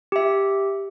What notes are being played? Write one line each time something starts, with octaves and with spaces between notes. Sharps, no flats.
G4 E5